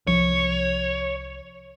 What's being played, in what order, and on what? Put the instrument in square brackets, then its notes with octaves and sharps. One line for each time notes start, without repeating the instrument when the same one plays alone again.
[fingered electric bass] C2 F3 [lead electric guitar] C#5